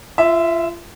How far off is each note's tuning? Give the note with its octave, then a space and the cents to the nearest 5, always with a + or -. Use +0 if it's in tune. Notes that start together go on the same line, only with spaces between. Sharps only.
F4 -30 E5 +0